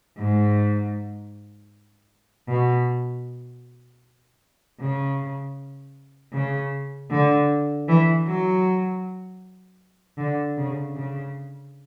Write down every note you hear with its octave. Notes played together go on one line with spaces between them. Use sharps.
G#2
B2
C#3
C#3
D3
E3
F#3
D3
C#3
C#3